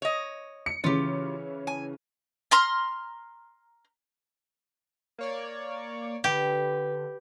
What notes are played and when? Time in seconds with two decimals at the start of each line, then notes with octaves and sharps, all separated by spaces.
0.02 C#5 D#5
0.66 C#7
0.84 C#3 E3 C#4 F4 G4
1.67 G#5
2.51 A#5 C6 F6
5.18 A#3 C#5 D5
6.24 D3 G4 B4